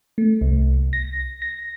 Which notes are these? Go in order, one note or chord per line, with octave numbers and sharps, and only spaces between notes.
A3
C2
A#6
A#6